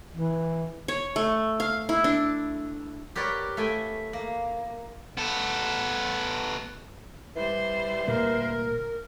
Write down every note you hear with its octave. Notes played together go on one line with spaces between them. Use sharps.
E3
C#5
A3
F5
E4
D4
G4 A#4 B4 C#5 D5
A3 E4 G5 G#5
A#3
B3 A4
E3 G3 C5
D2 A#2 A#4